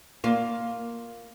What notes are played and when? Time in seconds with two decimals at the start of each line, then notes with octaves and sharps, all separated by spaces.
0.24 A#3 F4